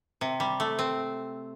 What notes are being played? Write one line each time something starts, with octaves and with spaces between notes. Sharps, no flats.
C3
G3
A3
C4